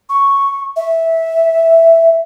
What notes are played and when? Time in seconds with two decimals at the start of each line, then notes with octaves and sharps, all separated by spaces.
0.09 C#6
0.76 E5